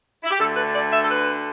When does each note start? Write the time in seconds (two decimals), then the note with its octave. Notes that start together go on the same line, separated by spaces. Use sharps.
0.23 E4
0.30 G4
0.38 D2 D3 A3 A4
0.55 B4
0.73 D5
0.91 E5
1.03 A4
1.08 B4